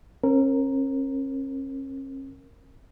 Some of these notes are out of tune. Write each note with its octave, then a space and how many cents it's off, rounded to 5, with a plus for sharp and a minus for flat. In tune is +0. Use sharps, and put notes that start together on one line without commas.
C#4 -45 A#4 +0